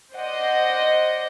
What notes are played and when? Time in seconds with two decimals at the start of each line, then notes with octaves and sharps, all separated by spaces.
0.14 C5 D5 D#5 F#5